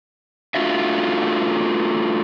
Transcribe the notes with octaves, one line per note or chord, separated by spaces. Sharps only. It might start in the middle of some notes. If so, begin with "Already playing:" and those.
A3 D4 F4 F#4 E5